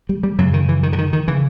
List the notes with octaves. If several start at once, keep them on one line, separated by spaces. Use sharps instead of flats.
G3
G3
F#2 C#3 F#3
D#3
E3
D#3
D3
D#3
D#3
C#3 E3